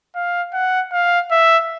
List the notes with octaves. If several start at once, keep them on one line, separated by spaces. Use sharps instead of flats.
F5
F#5
F5
E5